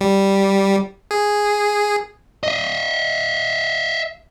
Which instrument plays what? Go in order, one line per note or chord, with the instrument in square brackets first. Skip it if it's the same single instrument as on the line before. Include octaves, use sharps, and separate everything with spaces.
[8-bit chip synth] G3
G#4
[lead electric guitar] D#5 E5